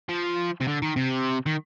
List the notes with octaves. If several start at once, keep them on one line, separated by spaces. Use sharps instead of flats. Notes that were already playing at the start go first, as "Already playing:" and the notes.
F3
C3
D3
D#3
C3
D#3